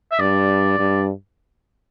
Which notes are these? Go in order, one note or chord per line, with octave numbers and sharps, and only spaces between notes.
E5
G2 D5
G2